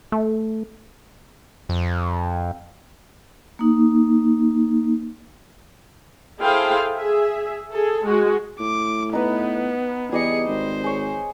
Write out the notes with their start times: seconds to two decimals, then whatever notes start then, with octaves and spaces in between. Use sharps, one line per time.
0.12 A3
1.69 F2
3.59 A#3 D#4
6.40 E4 G#4 A4 C5 F5 G5
6.97 G#4 E5
7.72 G#4 A4
8.04 G#3 F#4
8.60 A2 D6
9.13 B3 D#4 B4
10.12 E2 G3 G#4 D#5 D#6 C#7
10.48 G#1 C5
10.84 G#4 C#5